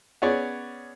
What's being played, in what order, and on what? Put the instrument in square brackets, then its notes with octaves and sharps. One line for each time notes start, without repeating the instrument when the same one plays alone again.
[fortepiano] B3 C#4 G#4 C#5 D5